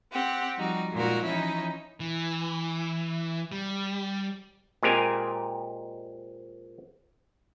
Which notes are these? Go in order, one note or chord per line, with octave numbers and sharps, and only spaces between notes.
C4 G4 F#5
F3 G3 D#4 F#4
A#2 G#3 D#4 F#4 A#4
E3 F3 C#4 D#4 E4
E3
G3
A#2 G#3 C4 G4 A#4 G#5